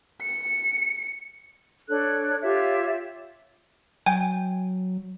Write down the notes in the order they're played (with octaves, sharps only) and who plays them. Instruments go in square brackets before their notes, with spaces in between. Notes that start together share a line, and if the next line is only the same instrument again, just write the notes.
[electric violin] C#7
[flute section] D4 A4 C#5 F#6
F4 G4 C#5 E5
[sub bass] F#3 [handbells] G5 G#5